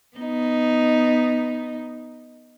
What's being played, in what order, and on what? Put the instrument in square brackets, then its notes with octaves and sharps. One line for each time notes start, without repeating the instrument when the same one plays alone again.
[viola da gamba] B3 D#4